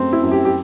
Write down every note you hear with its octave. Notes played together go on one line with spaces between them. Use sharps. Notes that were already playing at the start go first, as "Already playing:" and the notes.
Already playing: F#2 A3 C4
E4
F#2
G4
G4